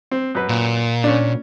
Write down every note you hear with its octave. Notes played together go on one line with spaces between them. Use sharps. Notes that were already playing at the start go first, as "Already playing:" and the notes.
C4
F#2 B4
A#2
C#4 D4